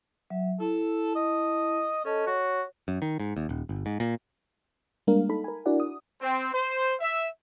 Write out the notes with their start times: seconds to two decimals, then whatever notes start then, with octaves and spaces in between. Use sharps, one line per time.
0.30 F#3 E5
0.60 E4 A4 A5
1.15 D#5
2.05 C#4 A4 D#5 A5
2.27 F#4 C#5
2.88 F#2
3.02 D#3
3.20 G#2
3.37 D#2
3.49 D#1
3.69 G1
3.86 G#2
4.00 A#2
5.07 G3 G#3 A#3 D4 A#4 F5
5.29 D#4 A4 B5
5.44 A#4 G#5
5.66 D4 E4 F#4 A#4 D5 F#5
5.80 D#6
6.21 C4
6.53 C5
7.00 E5